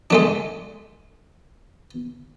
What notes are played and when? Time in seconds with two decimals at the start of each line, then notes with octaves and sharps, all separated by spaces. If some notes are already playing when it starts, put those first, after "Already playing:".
0.10 G#3 A3 D4